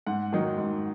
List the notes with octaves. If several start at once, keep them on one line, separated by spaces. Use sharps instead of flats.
G#2 F#5
D#3 F#3 D#4
G#2